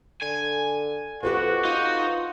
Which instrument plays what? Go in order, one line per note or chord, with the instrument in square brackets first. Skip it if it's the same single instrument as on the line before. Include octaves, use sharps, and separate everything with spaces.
[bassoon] D3 [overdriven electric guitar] G#5
[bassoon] F2 [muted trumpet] F#4 [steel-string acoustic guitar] G4 B4 C5
[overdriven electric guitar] D#4 [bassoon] F4